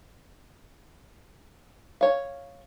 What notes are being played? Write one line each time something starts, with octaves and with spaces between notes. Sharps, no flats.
C#5 F5